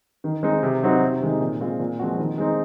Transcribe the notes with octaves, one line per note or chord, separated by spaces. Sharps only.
D#3
G#3 C4 D#4
C3
F#3 C4 D#4 F#4
C3
D#3 G#3 D#4
A#2
G#3 C4 F4
A#2
F3 G#3 C4 F#4
D#3
G#3 C4 D#4